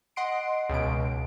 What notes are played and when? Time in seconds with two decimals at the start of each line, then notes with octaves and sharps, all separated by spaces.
0.16 D#5 F#5 C6 C7 D7
0.69 C#2 B2 D7